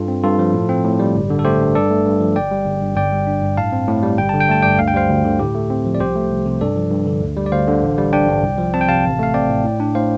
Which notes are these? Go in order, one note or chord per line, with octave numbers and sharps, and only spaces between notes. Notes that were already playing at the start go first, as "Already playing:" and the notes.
Already playing: G2 F4 A4
C4
G2 F4 A4
F3
A2
C4
A2
G3
G1
D3
A4
A3 G4 C5
G2
G2 A4 D5
A3
G2
F3
G1 D5 G5
G3
G1
G2
G1 D5 G5
G3
D4
G2
A2 F5 A5
C4
A2
G3
G1 G5
D3 A5
G5
A3 A5
G2 D5 G5
D2 F5
G5
G3 C5 F5
D2
D3
A2 G4
A3
C4
F3
D5
C2 G4 C5
A3
C2
C3
G2 A4 D5
F3
G2
D3
D2
G3
D5
D2 C5 F5
D3
A1
G3
D4 D5 G5
G2
C2
F3
C4 A5
G5
C3 F5 A5
A1
A3 F5
C4 D5 G5
A2
A2
D4
A2 C5 F5